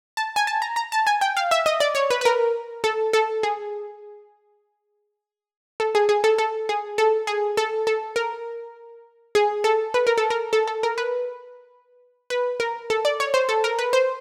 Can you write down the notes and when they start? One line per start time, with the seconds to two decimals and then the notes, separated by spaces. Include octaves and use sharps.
0.17 A5
0.36 G#5
0.47 A5
0.62 A#5
0.76 A#5
0.92 A5
1.07 G#5
1.21 G5
1.37 F5
1.51 E5
1.66 D#5
1.80 D5
1.95 C#5
2.10 B4
2.21 B4
2.25 A#4
2.84 A4
3.13 A4
3.43 G#4
5.80 A4
5.95 G#4
6.09 G#4
6.24 A4
6.38 A4
6.69 G#4
6.98 A4
7.27 G#4
7.57 A4
7.87 A4
8.16 A#4
9.35 G#4
9.64 A4
9.94 B4
10.07 A#4
10.18 A4
10.30 A#4
10.53 A4
10.68 A4
10.83 A#4
10.98 B4
12.30 B4
12.60 A#4
12.90 A4
13.05 D5
13.20 C#5
13.34 C5
13.49 A4
13.64 A#4
13.79 B4
13.93 C5